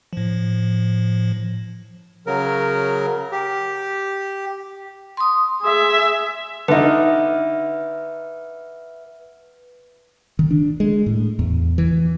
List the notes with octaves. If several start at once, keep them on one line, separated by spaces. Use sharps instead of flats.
A2 F3
C#3 F#3 A#4
G4
C6 D#6
G#4 E5
D3 D#4 B4 E5
D#3
D4
G#3
A2
E2
E3